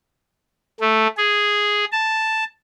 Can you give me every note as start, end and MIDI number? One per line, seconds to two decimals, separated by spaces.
0.80 1.07 57
1.17 1.85 68
1.92 2.44 81